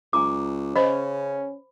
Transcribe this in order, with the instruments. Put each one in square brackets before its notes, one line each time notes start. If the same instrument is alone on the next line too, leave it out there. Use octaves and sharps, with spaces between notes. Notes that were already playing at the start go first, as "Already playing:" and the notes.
[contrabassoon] C#2 [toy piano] G#5 A#5 D6
[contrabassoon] C#3 [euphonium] C#4 [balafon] C5 D#5 [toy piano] B5